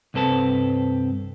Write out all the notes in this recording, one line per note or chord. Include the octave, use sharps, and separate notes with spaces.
C2 G2 C4 A4 B4 A5